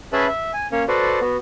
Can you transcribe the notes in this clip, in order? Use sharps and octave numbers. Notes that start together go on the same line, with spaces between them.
C#4 G#4 B4 E5 A5 B5
E5
G#5
A#3 C#4 C#5
F#4 A4 B4 C5 D5
B3 F#4